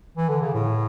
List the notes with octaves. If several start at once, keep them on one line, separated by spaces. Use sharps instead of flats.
E3
D3
C#3
A2